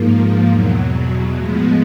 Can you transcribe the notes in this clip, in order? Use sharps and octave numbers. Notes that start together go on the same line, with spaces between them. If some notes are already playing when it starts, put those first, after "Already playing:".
Already playing: G#2 F3 A#3
E2 B2 F#3
A2 F3 G#3 B3